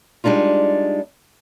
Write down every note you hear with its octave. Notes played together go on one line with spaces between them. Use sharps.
G3 G#3 D4 D#4 F4